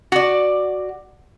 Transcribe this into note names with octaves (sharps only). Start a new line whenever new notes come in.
F#4 D5